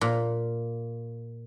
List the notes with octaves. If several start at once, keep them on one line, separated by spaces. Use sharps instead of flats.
A#2